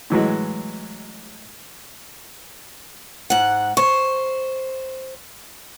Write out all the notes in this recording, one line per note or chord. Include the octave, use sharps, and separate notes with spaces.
A2 E3 F#3 G#3
G#2 F#5
C5 C#6